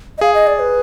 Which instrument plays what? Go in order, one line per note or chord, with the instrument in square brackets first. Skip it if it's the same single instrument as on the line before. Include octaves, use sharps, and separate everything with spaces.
[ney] D#5
[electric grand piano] G#4 [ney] F5
[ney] D#5
D5
B4